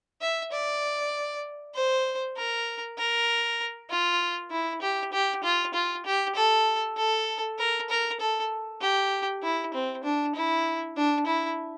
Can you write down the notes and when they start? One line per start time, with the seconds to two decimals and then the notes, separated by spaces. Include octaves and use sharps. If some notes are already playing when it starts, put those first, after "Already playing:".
0.21 E5
0.52 D5
1.75 C5
2.37 A#4
2.98 A#4
3.90 F4
4.51 E4
4.82 G4
5.13 G4
5.43 F4
5.74 F4
6.06 G4
6.36 A4
6.97 A4
7.59 A#4
7.90 A#4
8.20 A4
8.81 G4
9.43 E4
9.74 C4
10.04 D4
10.35 E4
10.96 D4
11.26 E4